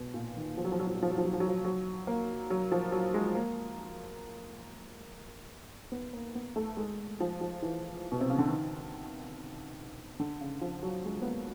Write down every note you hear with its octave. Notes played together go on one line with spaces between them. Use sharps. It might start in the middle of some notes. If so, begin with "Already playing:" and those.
Already playing: B2
A#2
D#3
F3
F#3
F3
F#3
F3
F#3
F3
F#3
F3
F#3
F3
F#3
F3
F#3
A#3
F#3
F3
F#3
G#3
A#3
B3
A#3
B3
A3
G#3
F3
F3
E3
B2
C3
C#3
D3
D#3
D3
C#3
F3
F#3
G#3
B3
A#3